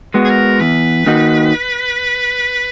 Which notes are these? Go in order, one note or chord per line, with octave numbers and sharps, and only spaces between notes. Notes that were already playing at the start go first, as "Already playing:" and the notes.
G#3 B3 F#4
G#4
A#4
E2 B4
D#3 A#3 D#4 F#4